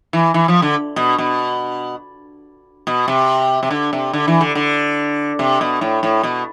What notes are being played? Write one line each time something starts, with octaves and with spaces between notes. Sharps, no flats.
E3
E3
F3
D3
B2
B2
B2
C3
C3
D3
C3
D3
E3
D3
D3
C3
B2
A2
A2
B2